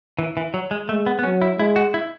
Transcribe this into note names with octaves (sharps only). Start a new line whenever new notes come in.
E3
E3
F#3
G#3
G#3 A3
B3
B3
F#3 C#4
E4
G#3 E4
F#4
E4